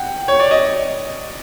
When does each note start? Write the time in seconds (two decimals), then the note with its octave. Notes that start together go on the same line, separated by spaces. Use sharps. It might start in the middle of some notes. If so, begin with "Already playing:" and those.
Already playing: F#5 G5
0.28 C#5
0.40 D5
0.51 D#5